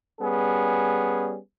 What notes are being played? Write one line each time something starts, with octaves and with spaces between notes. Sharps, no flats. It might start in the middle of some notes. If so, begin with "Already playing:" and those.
G3 B3 C#4 G#4